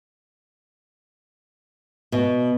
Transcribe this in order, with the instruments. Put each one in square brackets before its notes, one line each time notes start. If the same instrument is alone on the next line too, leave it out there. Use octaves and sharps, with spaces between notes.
[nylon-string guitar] B2